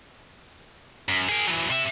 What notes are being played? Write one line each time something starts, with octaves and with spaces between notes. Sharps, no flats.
F#2
G#4 A#4
E3 F#3
C3 E5